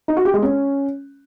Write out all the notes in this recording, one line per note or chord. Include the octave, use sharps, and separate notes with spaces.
D#4
F#4
G4
G#3
C#4